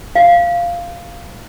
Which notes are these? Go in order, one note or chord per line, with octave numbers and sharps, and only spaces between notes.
F5